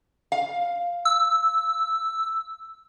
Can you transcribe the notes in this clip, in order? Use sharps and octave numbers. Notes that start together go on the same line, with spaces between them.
F5
E6